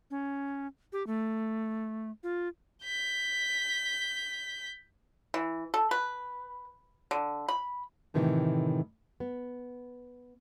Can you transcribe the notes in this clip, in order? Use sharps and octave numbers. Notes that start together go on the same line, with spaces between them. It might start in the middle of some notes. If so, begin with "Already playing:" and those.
C#4
G4
A3
F4
G6 B6
E3
A4
B4
D3
B5
A2 C3 D#3 E3 G3 A3
B3